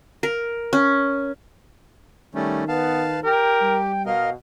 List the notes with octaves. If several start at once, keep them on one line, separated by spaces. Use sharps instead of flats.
A#4
C#4
D#3 G3 A3 C#4
B3 B4 F5 A5
G4 A#4 G5
G3
B2 A#4 D#5 F5